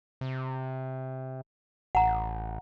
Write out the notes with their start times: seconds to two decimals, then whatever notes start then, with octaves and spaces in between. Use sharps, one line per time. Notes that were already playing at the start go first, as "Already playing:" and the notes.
0.21 C3
1.95 A1 F#5 A#5